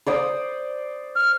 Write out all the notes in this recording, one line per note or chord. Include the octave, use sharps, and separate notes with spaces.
C5 D5 D#6
F6